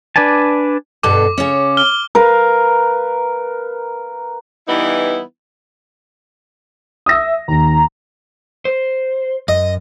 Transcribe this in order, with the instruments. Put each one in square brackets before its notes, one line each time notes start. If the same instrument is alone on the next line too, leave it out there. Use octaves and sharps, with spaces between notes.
[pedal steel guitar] D4 B4 D5 G#5 A5
[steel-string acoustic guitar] G2 B2 A4 [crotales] D6
[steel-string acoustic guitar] C#3 C#4
[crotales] F6 G7
[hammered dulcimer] A#4 B4 F5
[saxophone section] E3 G3 B3 D#4 E4
[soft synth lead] E5 [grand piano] D#6 E6 A#6
[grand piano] D#2 [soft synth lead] A#5
[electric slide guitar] C5
[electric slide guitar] F#2 [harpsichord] D#5